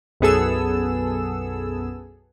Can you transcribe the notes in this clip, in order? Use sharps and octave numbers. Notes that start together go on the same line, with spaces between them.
B1 F#2 B3 G#4 A4 E6